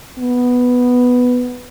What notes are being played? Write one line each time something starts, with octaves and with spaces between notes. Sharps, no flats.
B3